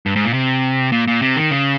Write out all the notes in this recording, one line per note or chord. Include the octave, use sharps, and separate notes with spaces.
G2
G#2
A#2
C3
A#2
A#2
C3
D#3
C#3